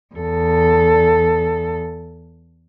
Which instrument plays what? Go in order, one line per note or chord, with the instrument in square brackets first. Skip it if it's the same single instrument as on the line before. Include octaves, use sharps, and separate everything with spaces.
[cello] E2 A4